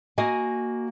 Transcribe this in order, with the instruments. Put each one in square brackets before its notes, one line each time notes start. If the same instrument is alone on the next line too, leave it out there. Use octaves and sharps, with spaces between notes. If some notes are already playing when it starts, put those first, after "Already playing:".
[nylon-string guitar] A#3 F#4 D#5 F5 G#5